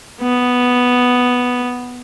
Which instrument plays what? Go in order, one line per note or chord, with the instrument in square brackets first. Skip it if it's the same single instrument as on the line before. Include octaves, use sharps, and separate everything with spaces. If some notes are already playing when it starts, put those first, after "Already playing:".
[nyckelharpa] B3